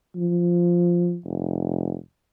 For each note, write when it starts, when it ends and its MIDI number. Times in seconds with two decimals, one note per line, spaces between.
0.16 1.17 53
1.25 1.97 29